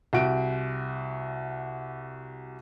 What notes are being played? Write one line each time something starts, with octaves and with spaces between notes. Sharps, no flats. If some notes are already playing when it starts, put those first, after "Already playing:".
C2 F#4 D7